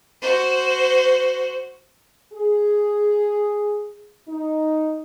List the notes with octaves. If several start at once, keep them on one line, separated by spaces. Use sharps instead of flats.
F#4 C5
G#4
D#4